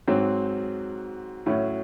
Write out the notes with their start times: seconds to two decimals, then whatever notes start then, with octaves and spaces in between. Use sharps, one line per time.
0.08 G#2 F#3 C4
1.46 A2 F#3 C#4 F#4